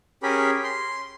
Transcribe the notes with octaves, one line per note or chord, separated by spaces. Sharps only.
C#4 G4 G#4 A#4 B5
C6